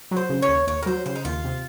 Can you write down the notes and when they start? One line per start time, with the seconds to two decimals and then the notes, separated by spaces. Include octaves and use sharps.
0.11 F#3
0.17 C5
0.29 C#3
0.42 C#5
0.48 D#2
0.67 D#2 C#5
0.83 A#4
0.86 F#3 C5
1.06 C#3 C5
1.16 D#4
1.25 D#2 F4
1.44 C3